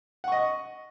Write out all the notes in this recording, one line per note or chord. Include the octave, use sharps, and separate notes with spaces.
D#5 F#5 C#6